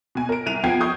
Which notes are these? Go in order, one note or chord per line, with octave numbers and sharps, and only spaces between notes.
B2 G#5
A#4 D7
C2 D#7 F7
F3 B3 G5 G#6 C7
C#6 D#6 G6 G#6